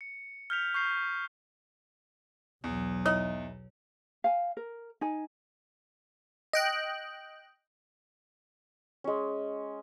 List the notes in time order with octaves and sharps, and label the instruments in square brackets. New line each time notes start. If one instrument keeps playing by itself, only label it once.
[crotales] C#7
F6 G6 B6 F7
C#6 G6 C7
[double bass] B1 F#3 [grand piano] E2
[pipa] D#4 E4 D#5 [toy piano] C#5
[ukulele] F5 G#5
A#4
D#4 G#5
[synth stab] D#5 G5 F#6
[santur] G#3 C#4